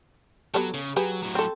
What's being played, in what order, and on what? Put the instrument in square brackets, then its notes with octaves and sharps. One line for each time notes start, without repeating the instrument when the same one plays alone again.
[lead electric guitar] F#3 [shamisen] B3 G4 A4
[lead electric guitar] C#3
[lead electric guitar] F#3 [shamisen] G4 G#4 B4
[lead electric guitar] A2 F#3
[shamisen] C4 A4